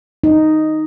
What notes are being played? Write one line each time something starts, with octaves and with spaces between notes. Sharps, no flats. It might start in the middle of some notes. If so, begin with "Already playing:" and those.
D#4